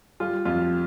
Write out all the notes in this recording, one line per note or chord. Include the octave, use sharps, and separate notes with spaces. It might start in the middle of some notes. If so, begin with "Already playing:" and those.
G3 F4
F2 F4